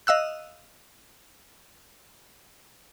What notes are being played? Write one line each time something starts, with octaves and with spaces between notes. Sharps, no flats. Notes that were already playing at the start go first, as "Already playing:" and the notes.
D#5 F5 E6 F#6